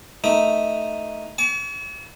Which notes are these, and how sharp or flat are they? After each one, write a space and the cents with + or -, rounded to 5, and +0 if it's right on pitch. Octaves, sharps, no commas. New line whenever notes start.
A3 +0 D#4 +0 A#4 +0
A5 -45 C#6 +45